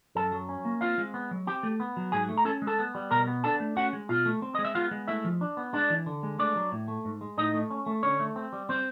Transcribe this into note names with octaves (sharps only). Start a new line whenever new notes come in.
F#2 A4 A5
F#3
C#4
A#3
C4 F4 F5
G#3
B3
F#3
C4 G4 G5
A3
B3
F#3
G#2 G#4 G#5
A3
A#5
C#4 A4 A5
G#3
A4 A5
B3
G3
B2 A#4 A#5
B3
D4 A4 A5
A3
C#4 F#4 F#5
G#3
B2 F4 F5
A3
C4
G#3 D#5
E5
B3 F4 F5
G#3
A3 E4 E5
F3
D4
B3
G#3 D4 D5
E3
D3
G#3
A3 D4 D5
F#3
A2
A3
G#2
G#3
A2 D#4 D#5
A3
C#4
A3
D3 C#4 C#5
A3
C4
G3
C4 C5